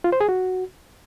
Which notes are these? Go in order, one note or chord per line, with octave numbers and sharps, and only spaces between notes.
F4
C5
G#4
F#4